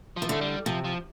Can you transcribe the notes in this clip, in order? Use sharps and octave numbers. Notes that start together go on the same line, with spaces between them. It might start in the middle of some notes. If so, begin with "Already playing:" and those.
F3
E3
D3 A3
G3
C3 F3
F3